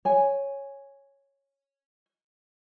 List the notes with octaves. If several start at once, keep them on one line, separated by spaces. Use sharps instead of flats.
C#5 G#5